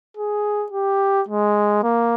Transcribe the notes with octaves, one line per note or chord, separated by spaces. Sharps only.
G#4
G4
G#3
A#3